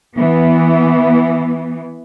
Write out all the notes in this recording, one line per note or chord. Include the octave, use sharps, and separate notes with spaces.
E3 B3